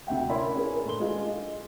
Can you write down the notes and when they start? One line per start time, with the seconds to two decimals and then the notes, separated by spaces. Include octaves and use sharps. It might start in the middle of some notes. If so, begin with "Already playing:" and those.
0.07 D2 C3 E5 F#5 G5
0.29 C#4 E4 A#4 D5 B5 C6
0.54 C#4 D4 E4 G#4 A#4 B4
0.85 A2 A4 C6 G7
1.00 G#3 D4 F4
1.27 D#5